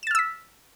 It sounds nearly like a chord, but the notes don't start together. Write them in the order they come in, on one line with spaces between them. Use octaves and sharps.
E7 A6 F6 E6 B6